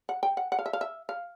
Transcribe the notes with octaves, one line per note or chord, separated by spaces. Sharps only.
F#5
G5
F#5
F#5
F5
E5
F5
E5
F5